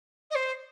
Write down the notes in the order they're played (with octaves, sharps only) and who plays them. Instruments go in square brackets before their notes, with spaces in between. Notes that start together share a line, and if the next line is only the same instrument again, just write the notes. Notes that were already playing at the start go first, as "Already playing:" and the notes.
[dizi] D#5
C5